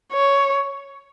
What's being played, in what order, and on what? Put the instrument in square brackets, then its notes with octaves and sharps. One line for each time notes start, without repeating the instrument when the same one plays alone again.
[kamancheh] C#5